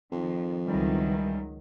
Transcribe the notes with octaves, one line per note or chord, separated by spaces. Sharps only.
F2 D#3 F3
C#2 D#3 E3 F#3 G3